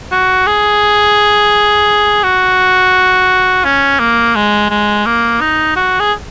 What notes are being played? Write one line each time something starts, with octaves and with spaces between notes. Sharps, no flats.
F#4
G#4
F#4
C#4
A#3
G#3
G#3
A#3
D#4
F#4
G#4